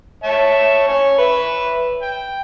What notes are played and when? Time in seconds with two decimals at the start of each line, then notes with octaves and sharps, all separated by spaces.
0.24 C#5 E5 A5
0.88 C#5 G#5
1.18 B4 E5
2.02 G5